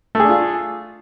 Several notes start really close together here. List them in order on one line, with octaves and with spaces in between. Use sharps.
A3 G#4 D4 F4